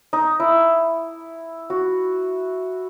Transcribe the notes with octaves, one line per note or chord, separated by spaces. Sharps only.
D#4
E4
F#4